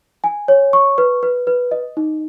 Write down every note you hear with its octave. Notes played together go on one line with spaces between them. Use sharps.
G#5
C#5
C#6
B4
B4
B4
D#5
D#4